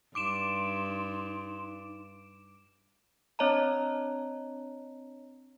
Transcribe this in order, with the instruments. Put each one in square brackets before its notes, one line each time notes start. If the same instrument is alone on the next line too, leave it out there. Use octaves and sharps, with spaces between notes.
[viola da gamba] G2 [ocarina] D#4 [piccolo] C6 [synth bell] D6 D7 E7
[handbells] C4 D4 C#5 D#5 A5 A#5